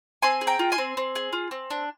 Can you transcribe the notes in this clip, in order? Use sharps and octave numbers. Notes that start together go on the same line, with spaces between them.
C4 G#5 C6
G#4
G5 A#5
F4
G#5 C6
C4
C4
G#4
F4
C4
D4